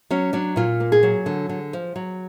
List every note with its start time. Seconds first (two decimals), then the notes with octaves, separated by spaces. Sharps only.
0.11 F#3 C#4
0.33 F#3 D4
0.56 A#2 F4
0.80 A#3
0.92 G#4
1.03 F#3
1.26 D3
1.49 D3
1.73 F3
1.96 F#3